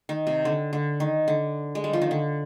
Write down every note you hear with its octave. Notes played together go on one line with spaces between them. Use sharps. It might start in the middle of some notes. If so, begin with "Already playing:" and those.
D#3
C3
D3
D3
D#3
D3
G#3
G3
F3
D#3
D3